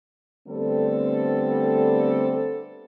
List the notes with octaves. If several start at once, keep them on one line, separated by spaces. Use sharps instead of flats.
D3 G3 A3 B3 C4 A4